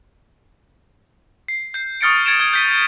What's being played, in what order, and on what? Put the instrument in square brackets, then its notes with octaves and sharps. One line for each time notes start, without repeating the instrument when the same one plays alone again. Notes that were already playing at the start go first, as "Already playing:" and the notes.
[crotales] C7
G6 C7
C#6 D#6 F6 A6 C#7 D7
G#6 A6 C#7 D7 E7
F6 G#6 D7
G6 B6 D#7